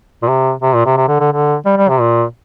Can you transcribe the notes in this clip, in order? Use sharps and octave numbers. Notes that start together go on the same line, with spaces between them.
A#2
C3
C3
A#2
C3
C3
D3
D3
D3
G3
G3
C3
A#2